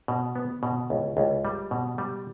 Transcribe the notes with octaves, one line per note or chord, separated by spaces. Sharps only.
B2
B3
B2
C#2
C#2
G3
B2
G3